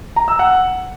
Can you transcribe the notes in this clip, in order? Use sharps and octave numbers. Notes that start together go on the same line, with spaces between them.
A#5
E6
F#5